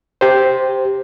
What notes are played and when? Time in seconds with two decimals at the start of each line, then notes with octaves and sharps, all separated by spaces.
0.21 G4 C5